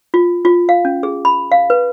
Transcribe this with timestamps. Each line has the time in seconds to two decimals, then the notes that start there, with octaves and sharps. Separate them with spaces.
0.14 F4
0.45 F4
0.69 F5
0.85 C#4
1.03 G#4
1.25 B5
1.52 F5
1.70 B4